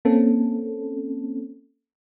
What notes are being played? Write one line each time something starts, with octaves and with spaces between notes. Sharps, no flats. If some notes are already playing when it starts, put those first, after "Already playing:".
A#3 C4 C#4 A4